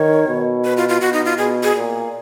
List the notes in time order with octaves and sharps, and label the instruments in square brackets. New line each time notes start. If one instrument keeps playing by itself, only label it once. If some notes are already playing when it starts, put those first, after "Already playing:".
Already playing: [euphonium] D#3 [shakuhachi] C#5
[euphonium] B2
[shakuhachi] B4
F4
F4
[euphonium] B2 [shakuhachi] F#4
[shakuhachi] D#4
F4
[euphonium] B2 [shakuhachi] G#4
[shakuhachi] G#4
[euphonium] A#2